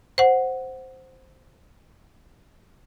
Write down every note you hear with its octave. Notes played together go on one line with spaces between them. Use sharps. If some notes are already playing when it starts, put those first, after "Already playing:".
C5 F#5